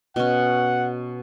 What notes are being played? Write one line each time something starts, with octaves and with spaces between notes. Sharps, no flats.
B2 C#4 F#5